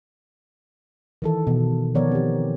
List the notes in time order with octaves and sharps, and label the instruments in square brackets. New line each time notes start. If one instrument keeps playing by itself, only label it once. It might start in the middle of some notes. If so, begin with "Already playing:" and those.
[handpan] D#3 E3 A4
B2
D#3 F3 B3 A#4 C#5 D5
C4 G4